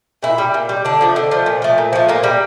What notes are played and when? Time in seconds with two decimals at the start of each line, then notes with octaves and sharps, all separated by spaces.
0.23 A#2 E4
0.38 G3
0.54 A#2
0.69 G3
0.85 D3 D4
1.01 F3 A3
1.16 D3
1.31 F3 A3
1.46 A#2
1.62 F3 A3
1.78 A#2
1.93 F3 A3
2.09 A#2 A#3
2.23 G3